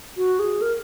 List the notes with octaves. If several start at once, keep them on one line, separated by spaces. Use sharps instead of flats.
F#4
G#4
A#4